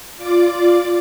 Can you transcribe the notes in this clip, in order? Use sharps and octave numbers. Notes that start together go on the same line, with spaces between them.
F4 D5 D6